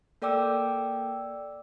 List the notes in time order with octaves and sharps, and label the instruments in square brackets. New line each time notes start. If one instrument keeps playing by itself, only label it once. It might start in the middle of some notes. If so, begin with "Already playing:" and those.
[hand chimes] A#3 A4 D5 G5 D6 E6